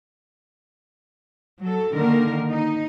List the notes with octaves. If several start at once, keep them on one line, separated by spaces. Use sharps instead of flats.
F#3 A4
D3 D#3 A#3 A#4
D#4